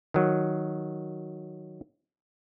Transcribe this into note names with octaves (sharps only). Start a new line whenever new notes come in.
D#3 F#3